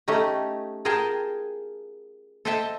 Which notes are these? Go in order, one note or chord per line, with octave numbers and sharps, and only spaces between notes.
A3 C#4 D#4 G4
F4 G#4 A#4 F5 G5 A5
A4 C5 D#5 E5 G5 A5